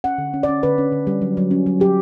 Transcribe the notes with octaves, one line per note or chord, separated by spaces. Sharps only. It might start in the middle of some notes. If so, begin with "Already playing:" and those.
C#4 F#5
D3
C#4
D5
C#4
D3 B4
C#4
D3
G3
F#3
F#3
C#4
F#3
F#3 G4